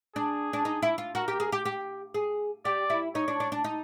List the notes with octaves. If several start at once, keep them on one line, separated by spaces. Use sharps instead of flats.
D4 G#4
D4
D#4
E4
F4
F#4 A#4
G4
G#4
G4
G4
G#4
G4 D5
E4
D#4 C#5
D4
D4
D4
D#4